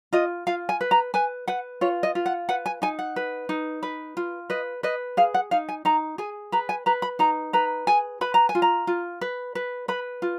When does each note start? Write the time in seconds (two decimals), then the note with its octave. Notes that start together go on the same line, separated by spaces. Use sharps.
0.13 F4 D#5
0.47 F4 F5
0.69 G#5
0.81 B4
0.91 A#5
1.14 B4 G#5
1.48 B4 F#5
1.81 F4 C#5
2.03 D#5
2.15 F4
2.26 F#5
2.49 B4 F#5
2.66 G#5
2.82 D#4 G#5
2.99 F#5
3.16 B4
3.49 D#4
3.83 B4
4.17 F4
4.50 B4 D#5
4.83 B4 D#5
5.17 G#4 F5
5.34 F#5
5.51 D#4 F5
5.69 G#5
5.85 D#4 A#5
6.18 G#4 G#5
6.52 B4 A#5
6.69 G#5
6.86 B4 A#5
7.02 B5
7.19 D#4 A#5
7.53 B4 A#5
7.87 G#4 G#5
8.21 B4 B5
8.34 A#5
8.49 G#5
8.55 F4
8.62 A#5
8.87 F4
9.21 B4
9.55 B4
9.88 B4 B5
10.22 F4